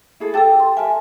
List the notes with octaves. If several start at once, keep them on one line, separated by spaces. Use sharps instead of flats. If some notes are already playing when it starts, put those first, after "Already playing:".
E4 G#4 A4
G4 A4 A5 E6 A6
C6
A#4 E5 G#5 A5